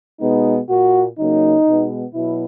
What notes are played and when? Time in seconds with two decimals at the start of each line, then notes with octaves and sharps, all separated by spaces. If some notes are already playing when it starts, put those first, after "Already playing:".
0.20 B2 G#3 B3 D#4
0.69 A#2 A#3 F#4
1.18 C#3 F#3 A#3 D#4
1.66 B2 G#3 B3
2.14 B2 F#3 E4